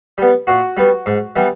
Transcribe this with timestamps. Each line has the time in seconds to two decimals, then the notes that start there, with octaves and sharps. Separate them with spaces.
0.18 G3 B3
0.47 A#2 F#4
0.77 G3 B3
1.06 G#2
1.36 E3 G3 B3